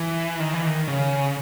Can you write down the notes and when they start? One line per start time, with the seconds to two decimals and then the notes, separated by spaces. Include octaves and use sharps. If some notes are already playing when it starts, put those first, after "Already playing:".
Already playing: E3
0.40 D#3
0.53 E3
0.66 D#3
0.88 C#3